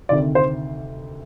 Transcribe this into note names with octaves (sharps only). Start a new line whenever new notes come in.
D2 C3 D#3 D5
C5